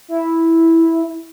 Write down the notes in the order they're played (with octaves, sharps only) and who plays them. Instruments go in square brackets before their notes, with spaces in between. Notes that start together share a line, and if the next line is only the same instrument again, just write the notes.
[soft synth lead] E4